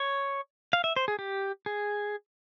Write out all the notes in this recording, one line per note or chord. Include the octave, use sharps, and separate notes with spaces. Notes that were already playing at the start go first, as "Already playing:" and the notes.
Already playing: C#5
F5
E5
C5
G#4
G4
G#4